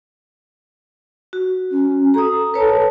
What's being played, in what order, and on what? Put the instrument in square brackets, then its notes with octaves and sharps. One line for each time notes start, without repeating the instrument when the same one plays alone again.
[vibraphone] F#4
[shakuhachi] C#4
[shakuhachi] A4 [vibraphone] A#5 D#6
[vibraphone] B4 C#5 A5